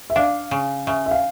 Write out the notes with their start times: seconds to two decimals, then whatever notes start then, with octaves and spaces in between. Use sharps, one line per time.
0.10 E5
0.16 D4 F5
0.51 C#3
0.87 C#3 E5
1.06 E5
1.11 F5